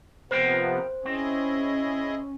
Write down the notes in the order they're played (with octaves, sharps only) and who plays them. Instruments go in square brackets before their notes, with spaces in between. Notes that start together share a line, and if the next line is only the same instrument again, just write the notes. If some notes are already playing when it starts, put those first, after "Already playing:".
[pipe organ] C3 F3 B3 [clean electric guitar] A#4 F5 G5 [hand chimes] C5
[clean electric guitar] C4 [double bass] C#4 [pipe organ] E4 G#4 D#5